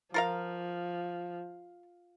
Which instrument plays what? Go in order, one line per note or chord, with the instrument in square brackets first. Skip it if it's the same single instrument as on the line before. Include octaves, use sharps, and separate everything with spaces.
[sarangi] F3 [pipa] F4 A#4 F5